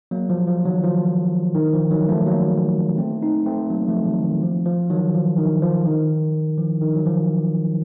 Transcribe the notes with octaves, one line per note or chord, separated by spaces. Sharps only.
F#3 A#3
F3
F3
D#3 F#3
F3
D#3
F3
D#3 F#3
F3 A3
F#3 A#3
A3 C4
C4 D#4
A3 C4
F#3 A#3
F3 A3
D#3 F#3
D#3
F3
F3
D#3 F#3
F3
D#3
F3
D#3
F3
D#3
F#3
F3